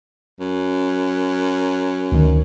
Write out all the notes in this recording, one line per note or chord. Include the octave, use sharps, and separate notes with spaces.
F#2
D2 D#3